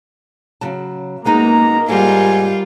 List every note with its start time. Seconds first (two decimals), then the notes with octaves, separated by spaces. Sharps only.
0.61 C#3 F#3 A5
1.25 F#2 G#3 A#3 B3 D#4 D#5 A#5
1.88 G#2 G3 F4 A4 A#4 G#5